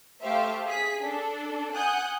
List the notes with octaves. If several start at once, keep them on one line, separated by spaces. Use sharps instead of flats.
A3 G4 C5 E5 F5
G#4 B6
D4 A4
F#5 G#5 D#6 F#6 G6